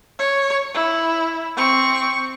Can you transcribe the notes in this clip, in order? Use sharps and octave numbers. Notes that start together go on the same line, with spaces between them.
C#5
E4
C4 C#6